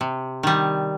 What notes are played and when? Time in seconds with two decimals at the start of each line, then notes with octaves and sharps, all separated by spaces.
0.01 C3
0.43 D#3 G3